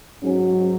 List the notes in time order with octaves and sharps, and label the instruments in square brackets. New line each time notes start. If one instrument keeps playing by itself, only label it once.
[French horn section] G#2 F#3 C#4